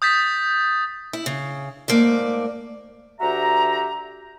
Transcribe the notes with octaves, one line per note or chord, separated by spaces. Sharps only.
D#6 G6 A6 B6
E4
C#3
G#2 A3 A#3 D5
D2 F#4 G4 E5 A#5